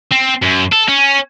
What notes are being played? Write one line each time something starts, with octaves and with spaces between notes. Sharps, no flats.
C4
F#2
A4
C#4